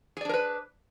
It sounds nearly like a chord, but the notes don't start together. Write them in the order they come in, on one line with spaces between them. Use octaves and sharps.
G#4 D5 D4 A#4 B4